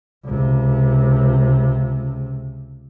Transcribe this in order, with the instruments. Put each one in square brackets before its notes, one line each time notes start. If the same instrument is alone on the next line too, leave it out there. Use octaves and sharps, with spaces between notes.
[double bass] C#2 C3